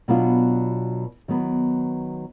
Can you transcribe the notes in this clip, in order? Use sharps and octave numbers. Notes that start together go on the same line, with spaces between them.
B2 F#3 B3 D4 F4
D#3 F#3 B3